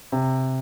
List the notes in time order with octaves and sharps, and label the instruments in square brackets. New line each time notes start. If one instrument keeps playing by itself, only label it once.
[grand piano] C3